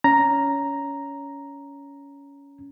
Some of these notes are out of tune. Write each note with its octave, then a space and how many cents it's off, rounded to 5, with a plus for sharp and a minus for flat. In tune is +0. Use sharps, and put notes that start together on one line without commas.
C#4 +20 A#5 +0